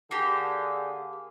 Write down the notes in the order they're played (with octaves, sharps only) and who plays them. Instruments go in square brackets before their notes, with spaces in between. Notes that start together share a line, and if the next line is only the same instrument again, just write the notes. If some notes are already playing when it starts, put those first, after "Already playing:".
[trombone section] D3 G#4 [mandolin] A#3 G4